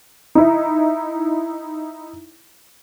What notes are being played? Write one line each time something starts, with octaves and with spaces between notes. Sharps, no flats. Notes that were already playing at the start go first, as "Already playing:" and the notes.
D#4 E4